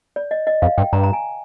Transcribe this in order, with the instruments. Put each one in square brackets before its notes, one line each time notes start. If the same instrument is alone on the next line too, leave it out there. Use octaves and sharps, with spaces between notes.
[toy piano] D5
D#5
D#5
[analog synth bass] F2 [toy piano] F5
[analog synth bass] G2 [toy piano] G5
[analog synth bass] G2 [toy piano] A#5
[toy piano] A#5
G#5